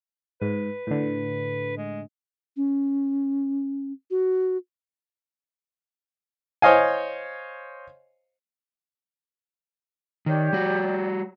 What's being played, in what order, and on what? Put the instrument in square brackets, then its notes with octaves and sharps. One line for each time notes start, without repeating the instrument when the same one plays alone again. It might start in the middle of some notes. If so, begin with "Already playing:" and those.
[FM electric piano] G#2 [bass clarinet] B4
[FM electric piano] A2 D3
[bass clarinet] G#3
[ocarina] C#4
F#4
[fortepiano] C5 C#5 D#5 F5 G#5
[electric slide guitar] D#3 [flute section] G4 C#5 D5
[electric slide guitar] G3 F#4